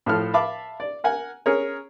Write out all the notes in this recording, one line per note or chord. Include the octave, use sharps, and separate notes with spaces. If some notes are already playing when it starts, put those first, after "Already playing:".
A2 F3 A4 F6
E5 F5 A5 B5 D6
D5
A#4 F#5 G#5
C#4 G#4 A#4 C#5